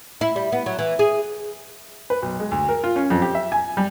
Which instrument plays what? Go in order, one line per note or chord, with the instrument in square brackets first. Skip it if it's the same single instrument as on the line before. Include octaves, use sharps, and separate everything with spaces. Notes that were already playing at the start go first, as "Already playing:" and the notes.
[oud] E4
G3
B3
F#3
E3
G#4
[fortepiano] B4
B1
G#3
D2
A#4
F4
C#4
F2
G4
E5
G#5
G3